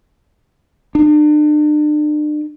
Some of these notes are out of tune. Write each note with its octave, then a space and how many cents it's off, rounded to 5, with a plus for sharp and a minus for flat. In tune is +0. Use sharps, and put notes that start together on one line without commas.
D4 +40